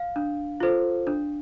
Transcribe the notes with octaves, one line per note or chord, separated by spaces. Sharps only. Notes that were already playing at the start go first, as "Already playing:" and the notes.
Already playing: F5
D4
F4 A4 C5
D4